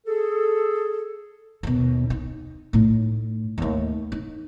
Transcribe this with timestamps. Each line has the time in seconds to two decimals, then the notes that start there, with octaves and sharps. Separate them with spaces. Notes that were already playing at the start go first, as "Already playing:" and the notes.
0.07 G#4 A4
1.63 D#2 B2
2.10 D#4
2.73 A2 D#4
3.58 D#2 A3
4.12 D#4